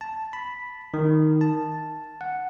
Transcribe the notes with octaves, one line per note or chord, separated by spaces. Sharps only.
A5
B5
D#3
A5
F#5